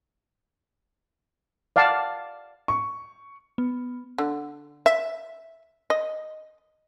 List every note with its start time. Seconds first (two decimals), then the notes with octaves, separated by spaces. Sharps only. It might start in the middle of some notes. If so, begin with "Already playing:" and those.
1.76 D5 F5 F#5 A5
2.68 C#6
3.58 B3
4.18 D3
4.86 E5
5.90 D#5